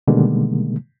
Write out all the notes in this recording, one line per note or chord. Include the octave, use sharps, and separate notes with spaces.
B2 D3 D#3 G3 G#3 A#3